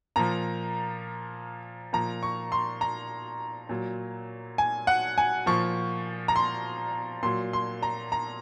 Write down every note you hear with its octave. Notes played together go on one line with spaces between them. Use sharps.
A#2 F3 A#5
A#2 F3 A#5
C#6
C6
A#5
A#2 F#3
G#5
F#5
G#5
A#2 F3 C#6
A#5
C6
A#2 F#3 C6
C6
A#5
A#5